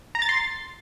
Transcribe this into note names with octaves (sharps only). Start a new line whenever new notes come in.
A#5
A6
C6